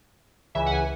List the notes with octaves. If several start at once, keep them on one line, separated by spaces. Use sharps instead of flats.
C#2 C#3 E3 E5
F#5
G#5